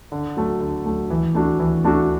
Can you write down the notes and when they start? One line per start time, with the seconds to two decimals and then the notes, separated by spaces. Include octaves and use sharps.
0.12 D3
0.37 F#3 A3
0.61 D3
0.86 F#3 A3
1.10 E3
1.35 A3 D4 F#4
1.59 E3
1.84 A3 D4 F#4